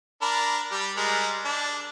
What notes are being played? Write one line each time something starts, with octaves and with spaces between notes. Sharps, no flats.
D4 A#4 B5
G3 G4
G3 G#3 A#4
D4